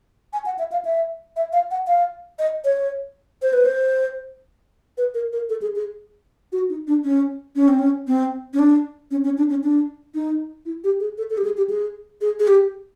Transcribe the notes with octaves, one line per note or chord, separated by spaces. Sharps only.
G#5
F#5
E5
F5
E5
E5
F5
F#5
F5
D#5
C#5
C5
B4
C5
B4
A#4
A#4
A4
G#4
G#4
F#4
D#4
D4
C#4
C#4
C4
C#4
C4
C#4
D4
C#4
C#4
D4
C#4
D4
D#4
E4
G4
G#4
A4
A4
G4
G#4
G4
G#4
G#4
G#4
G4